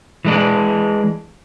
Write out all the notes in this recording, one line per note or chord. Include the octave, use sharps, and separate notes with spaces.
E3 G#3 D4